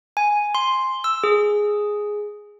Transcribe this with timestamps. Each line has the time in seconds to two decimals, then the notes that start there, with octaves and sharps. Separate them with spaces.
0.17 G#5
0.55 C6
1.04 E6
1.24 G#4